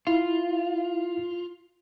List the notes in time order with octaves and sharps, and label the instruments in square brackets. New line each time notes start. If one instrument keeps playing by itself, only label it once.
[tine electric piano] E4 [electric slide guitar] F4